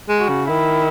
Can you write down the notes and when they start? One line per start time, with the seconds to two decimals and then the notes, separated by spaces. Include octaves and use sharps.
0.09 G#3
0.19 F#4
0.29 C#3
0.49 D#3 E4